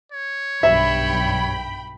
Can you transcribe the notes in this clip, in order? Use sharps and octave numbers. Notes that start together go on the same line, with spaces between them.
C#5
B1 G2 E5 G5 B5